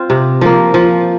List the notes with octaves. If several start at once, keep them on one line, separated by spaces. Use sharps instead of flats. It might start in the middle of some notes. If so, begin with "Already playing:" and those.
Already playing: C4 F4
C3
F3 A#3
F3